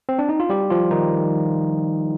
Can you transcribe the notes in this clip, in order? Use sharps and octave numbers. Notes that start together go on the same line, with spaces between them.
C4
D4
D#4
F4
G3 G4
F3 F4
D#3 D#4